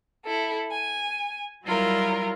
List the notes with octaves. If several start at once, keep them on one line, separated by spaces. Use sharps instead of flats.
E4 A4
G#5
F#3 G3 E4 F4 A#4